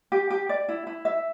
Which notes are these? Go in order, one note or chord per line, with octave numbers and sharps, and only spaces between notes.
G4
G4
D5
E4
E4
E5